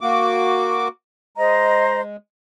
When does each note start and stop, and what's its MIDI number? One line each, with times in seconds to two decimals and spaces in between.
0.01 0.88 58
0.01 0.88 66
0.01 0.88 86
1.37 2.16 56
1.37 2.01 72
1.37 2.01 75
1.37 2.01 82